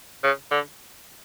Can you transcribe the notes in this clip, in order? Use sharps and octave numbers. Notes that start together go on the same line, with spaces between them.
C#3
D3